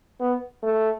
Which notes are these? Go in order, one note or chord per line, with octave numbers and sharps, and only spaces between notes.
B3
A3